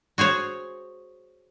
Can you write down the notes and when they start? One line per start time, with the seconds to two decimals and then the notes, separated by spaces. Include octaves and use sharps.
0.18 F#4 G#4 C5 C#5